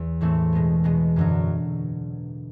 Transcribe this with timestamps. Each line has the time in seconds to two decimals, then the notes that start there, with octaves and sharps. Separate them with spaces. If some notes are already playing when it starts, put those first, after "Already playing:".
Already playing: E2
0.21 A2 E3 A3 C4
0.53 B2 G#3 B3
0.84 B2 G#3 B3
1.16 F#2 D3 F#3